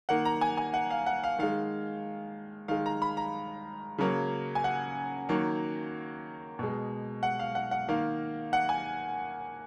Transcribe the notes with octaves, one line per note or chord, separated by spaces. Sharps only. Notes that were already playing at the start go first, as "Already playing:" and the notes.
D#3 A#3 F#5
A#5
G#5
G#5
F#5
F5
F#5
F5
D#3 G#3 F5
D#3 G#3 F5
A#5
B5
A#5
C#3 F#3 A#3
G#5
F#5
D#3 F#3 A#3
B2 G#3
F#5
F5
F#5
F#5
D#3 A#3 F5
F#5
G#5